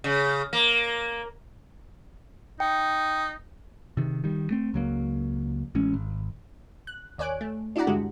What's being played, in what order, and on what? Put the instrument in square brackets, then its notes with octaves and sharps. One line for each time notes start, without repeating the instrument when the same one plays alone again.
[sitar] C#3
A#3
[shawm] D#4 [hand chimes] G5
[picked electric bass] C3 D#3
D#3 G3
A3 C4
C#2 F#3 A#3
A1 G#3 C#4
G#1
[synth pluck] F#6
D#2 C#5 D5 G#5 F#6 D7
A3
D4 E4 F#4 D5 F#5 A#5
G2 D3 G#3 F#4 G4